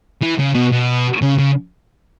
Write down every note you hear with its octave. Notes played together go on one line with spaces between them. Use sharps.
E3
C#3
B2
B2
C#3
C#3